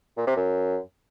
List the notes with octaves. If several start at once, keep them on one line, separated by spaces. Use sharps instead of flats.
A#2
C3
F#2